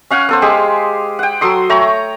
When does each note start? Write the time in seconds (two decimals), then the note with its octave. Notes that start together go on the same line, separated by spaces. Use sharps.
0.11 C#4 F5 F#5 G#5
0.29 B3 A4 C5
0.42 G#3 G4 G#4
1.19 F#5 G5
1.41 F#3 A4 C6 D#6
1.69 A3 C#5 G5 A#5